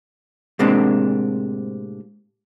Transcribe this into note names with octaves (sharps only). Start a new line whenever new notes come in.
A2 C3 G#3 A#3 C4 D4